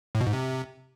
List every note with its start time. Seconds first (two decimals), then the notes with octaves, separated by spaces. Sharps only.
0.15 A2
0.21 B2
0.27 G#2
0.33 C3